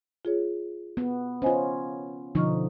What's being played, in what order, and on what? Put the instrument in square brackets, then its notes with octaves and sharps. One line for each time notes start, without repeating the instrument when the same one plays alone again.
[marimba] F4 G#4 C#5
[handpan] B3
[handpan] C#4 F4 [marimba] C5 D#5 G#5
[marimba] B2 C#6 F6 [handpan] D3 F3 D#4